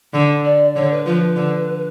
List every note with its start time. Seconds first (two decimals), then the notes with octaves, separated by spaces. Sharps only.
0.14 D3
0.44 D5
0.75 D3 C#5
0.91 B4
1.06 F3 B4
1.37 D3